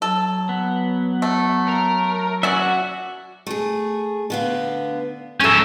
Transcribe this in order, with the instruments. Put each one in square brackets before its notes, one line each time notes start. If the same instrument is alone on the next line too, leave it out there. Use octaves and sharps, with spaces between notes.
[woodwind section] F#3 [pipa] A4
[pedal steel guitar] B3
[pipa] A3
[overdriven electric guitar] A#4
[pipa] C#4 D5 [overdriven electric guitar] F#4 [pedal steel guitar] E5 F#5
[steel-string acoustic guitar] A3 G#4
D3 B3 F5
[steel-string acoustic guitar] G#3 A4 [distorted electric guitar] C#4 E5